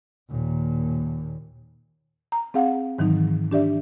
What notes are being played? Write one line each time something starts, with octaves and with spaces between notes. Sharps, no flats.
D#2 A#2
A#5
C4 G#4 F5 F#5
G#2 D#3 E3 F#3 D#4
D4 G4 D5 E5